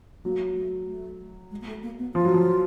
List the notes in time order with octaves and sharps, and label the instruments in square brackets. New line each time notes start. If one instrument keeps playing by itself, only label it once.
[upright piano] F#3 [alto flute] A#3
[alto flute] A3
A3
G#3
A#3
A3
A#3
B3
[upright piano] F3 [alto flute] F4
[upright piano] F#3
F3